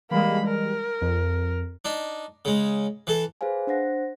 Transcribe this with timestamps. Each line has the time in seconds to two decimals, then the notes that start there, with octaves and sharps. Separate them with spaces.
0.11 E3 G3 G#3 A#3 B5
0.47 A#4
1.01 F2
1.85 D4 D#4
2.45 C#3 G#3
3.07 E3 A4
3.41 G#4 B4 C5 F5 G#5
3.67 D4 C5 F#5 A#6